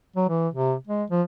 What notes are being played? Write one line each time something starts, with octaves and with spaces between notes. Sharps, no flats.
F#3
E3
C3
G#3
F3